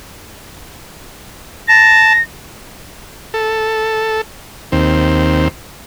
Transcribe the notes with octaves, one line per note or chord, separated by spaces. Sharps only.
A5 A#6
A4
D#2 C4